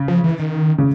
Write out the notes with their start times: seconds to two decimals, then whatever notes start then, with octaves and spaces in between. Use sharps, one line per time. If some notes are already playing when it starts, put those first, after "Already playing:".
Already playing: C#3
0.08 F3
0.24 E3
0.39 D#3
0.78 C#3